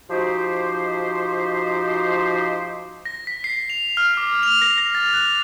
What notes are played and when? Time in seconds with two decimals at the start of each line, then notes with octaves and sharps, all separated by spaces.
0.10 F3 D#4 F#4 G4 C5
3.05 A#6
3.27 B6
3.44 C7
3.70 F7
3.97 F6
4.17 D6
4.43 F7
4.62 A#6
4.78 A#6
4.95 A6
5.14 F#6